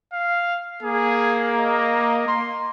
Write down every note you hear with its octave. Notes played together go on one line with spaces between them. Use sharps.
F5
A#3 G#4
D#5
C6